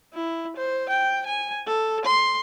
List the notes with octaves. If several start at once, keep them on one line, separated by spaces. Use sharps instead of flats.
E4
C5
G5
G#5
A4
C6